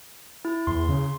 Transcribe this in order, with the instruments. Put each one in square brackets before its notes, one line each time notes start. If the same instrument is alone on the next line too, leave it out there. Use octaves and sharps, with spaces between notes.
[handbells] E4
[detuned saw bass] E2 [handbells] C6
[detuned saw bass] C#3